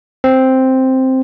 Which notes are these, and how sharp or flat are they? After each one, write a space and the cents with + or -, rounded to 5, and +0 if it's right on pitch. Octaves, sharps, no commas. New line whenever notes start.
C4 +0